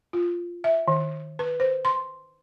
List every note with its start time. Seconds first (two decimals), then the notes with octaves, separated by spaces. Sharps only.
0.13 F4
0.64 E5
0.88 D#3
1.39 B4
1.60 C5
1.85 C6